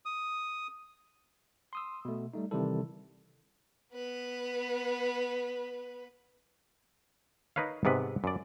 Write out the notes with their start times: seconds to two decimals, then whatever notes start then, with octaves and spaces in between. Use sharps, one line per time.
0.05 D#6
1.73 C6 D#6 E6
2.05 B2 A3
2.34 G3 A3 D#4
2.51 C3 D#3 E3 G3 E4 A4
3.93 B3 B4
7.56 D#4 A#4 B4 C#5 F5
7.85 G#2 C3 B3 B4
8.24 F#2 D5